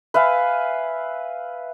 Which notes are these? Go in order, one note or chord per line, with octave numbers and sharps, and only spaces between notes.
B4 E5 F5 G#5